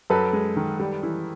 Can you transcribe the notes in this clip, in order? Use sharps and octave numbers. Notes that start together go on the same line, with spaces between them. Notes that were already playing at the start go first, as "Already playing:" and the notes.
F#2 A4 B4
G#3
D#3
G3
E3